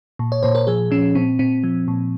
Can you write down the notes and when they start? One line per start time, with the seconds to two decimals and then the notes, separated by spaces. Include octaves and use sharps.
0.19 A#2
0.32 C#5
0.43 A#2 C5
0.55 A#4
0.67 F3 G#4
0.91 F3 C#4
1.15 A#2 C4
1.39 A#2 C4
1.63 F3
1.88 A#2